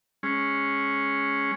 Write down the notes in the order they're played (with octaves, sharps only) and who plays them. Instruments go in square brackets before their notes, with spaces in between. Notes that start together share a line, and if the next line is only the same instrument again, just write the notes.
[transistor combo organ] G#3 C#4